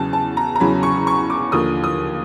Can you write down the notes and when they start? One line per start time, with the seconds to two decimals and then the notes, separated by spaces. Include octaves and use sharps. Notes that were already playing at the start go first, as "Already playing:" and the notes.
Already playing: E2 C#3 F#3 A5
0.13 A5
0.37 A#5
0.55 A#5
0.60 E2 C#3 F#3 B5
0.83 C#6
1.07 C#6
1.30 D6
1.52 D#2 D3 F3 D#6
1.84 D#6